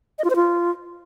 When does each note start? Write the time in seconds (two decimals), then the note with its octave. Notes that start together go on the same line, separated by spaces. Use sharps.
0.19 D#5
0.24 F4
0.30 C5
0.36 F4